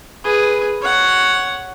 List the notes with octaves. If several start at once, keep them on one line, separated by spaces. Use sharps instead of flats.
G#4 B4
C#5 F#5